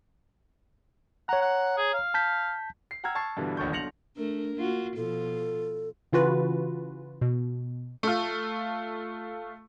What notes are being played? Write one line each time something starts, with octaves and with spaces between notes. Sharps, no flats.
C#5 F#5 A#5
F#5
G#4
F5
A5 G6 B6
C7
F#5 G5 A#5 E6 F6 G#6
A5 C#6 G#6 A6 C7
G2 B2 D3 E3 G3
D#1 A1 D3 C#6 G6
B1 D3 A#6 C#7 F7 F#7
A3 D4 A#4
A#3 F4 F#4
B2 F3 F4 A4
C#3 E3 F4 F#4 B4
B2
A3 F4